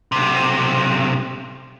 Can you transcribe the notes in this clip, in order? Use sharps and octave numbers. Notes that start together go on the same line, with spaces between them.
B1 C3